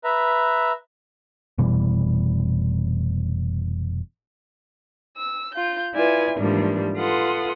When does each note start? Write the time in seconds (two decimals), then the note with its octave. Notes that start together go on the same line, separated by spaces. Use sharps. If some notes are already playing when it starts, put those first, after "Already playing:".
0.04 B4 E5 A#5
1.58 F1 B2 E3 G3
5.18 E6
5.55 F4 G6
5.94 E4 F4 B4 D5 G#5
6.38 G#2 E3 F3 G3 A#3 D4
6.96 F4 A4 B4 F#5 C6 D#6